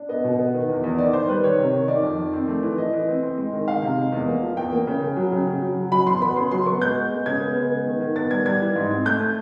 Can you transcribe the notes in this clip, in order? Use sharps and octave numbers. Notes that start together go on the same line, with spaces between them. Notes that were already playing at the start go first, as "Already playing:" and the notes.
Already playing: D4
B3 D#5
B2
B3
D#3
E2
E2
D#3 D5
D#3 C5
G3 B4
D#3 C#5
C3
D#3
D#3 D5
F2
D#3
C4
A3
E3
E3 D#5
E3
C4
C4
G#3
D#3
D#3 F5
C3
G#3
E2
A#3
F3
E2 G5
A#3
C#3
C#3
F#3
C#3
C#3
F#3
F#3
F#3 B5
E2 C6
B3 B5
C#3 C6
F#3 C6
B3 C#6
G#3 G6
B3
G#3
C#3 G#6
B3
G#3
B3
D#3
D#3
B3 A6
G3 G#6
G3 G#6
E3
G#2
C4
A3 G6
A3